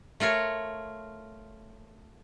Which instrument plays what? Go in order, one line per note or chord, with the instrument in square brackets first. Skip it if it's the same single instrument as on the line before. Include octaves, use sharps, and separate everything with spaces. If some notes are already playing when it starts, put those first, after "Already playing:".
[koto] A3 F4 A#4 C#5